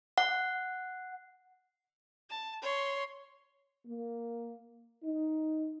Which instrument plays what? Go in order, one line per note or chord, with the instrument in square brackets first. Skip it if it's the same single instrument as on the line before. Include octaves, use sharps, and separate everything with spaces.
[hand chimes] F#5
[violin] A5
C#5 C6
[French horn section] A#3
D#4